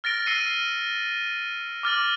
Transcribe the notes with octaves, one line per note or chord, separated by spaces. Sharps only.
F6 A6 A#6 D7 G7
E6 F6 C7 C#7 D#7
D6 F6 A6 F#7